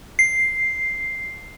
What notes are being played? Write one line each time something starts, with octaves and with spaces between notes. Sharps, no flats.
C7